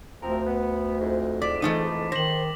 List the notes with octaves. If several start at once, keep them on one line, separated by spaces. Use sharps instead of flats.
D2 F3 C4 A#4
B3
F2 G#2
D5 D6 A6 B6
E3 A3 D#4
D#3 C5 A#6 F#7